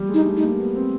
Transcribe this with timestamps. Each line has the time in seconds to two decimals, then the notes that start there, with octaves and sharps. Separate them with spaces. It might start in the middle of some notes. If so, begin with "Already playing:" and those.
Already playing: G3
0.09 G#3
0.14 D#4
0.25 A3
0.37 D#4
0.42 A#3
0.59 B3
0.75 C4